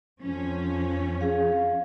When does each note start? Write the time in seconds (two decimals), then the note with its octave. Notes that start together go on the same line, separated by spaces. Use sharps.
0.20 F2 C#4
1.21 G#4 F5